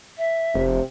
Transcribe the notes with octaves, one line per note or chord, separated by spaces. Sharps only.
E5
F1 C3